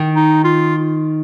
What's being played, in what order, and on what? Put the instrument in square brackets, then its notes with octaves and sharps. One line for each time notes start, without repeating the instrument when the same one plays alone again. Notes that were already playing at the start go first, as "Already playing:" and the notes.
Already playing: [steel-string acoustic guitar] D#3
[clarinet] D#4
F4